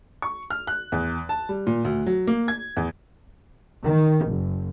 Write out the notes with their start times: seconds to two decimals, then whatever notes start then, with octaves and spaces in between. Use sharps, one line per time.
0.22 C#6
0.50 F6
0.67 F#6
0.92 E2
1.29 A5
1.49 G3
1.67 A#2
1.85 D2
2.06 F#3
2.27 A#3
2.48 G#6
2.77 E2
3.83 D#3
4.26 F#1